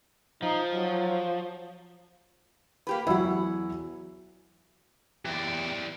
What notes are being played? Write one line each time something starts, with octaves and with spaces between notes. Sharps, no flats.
F3 D#4
F#3
A#3 G4 B4
E2 F#3 E4 F#5
E2 E3 G4 D5